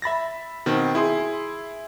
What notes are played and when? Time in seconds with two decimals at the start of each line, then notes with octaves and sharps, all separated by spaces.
0.02 E5 B5 A6 A#6
0.66 B2 D#3 C4
0.95 E4 G#4 C6